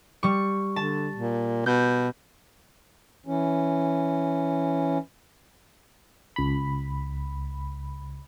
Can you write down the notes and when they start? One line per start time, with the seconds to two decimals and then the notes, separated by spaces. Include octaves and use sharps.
0.23 G3 C#6
0.76 D3 A5
1.15 A#2
1.66 B2 G6
3.26 E3 C#4
6.36 C#2 B5